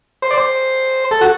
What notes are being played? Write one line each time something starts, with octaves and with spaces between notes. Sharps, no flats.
C5
D5
C5
A4
F#4